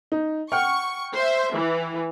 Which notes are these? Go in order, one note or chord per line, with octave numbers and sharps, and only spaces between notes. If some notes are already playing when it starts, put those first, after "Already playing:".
D#4
F#5 G5 C#6 F6
C5 E5
E3